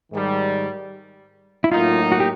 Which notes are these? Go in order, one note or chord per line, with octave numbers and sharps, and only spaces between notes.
G#2 D#3 G3
E4
A2 F#3 A#3 D#4 F4
F#4
G4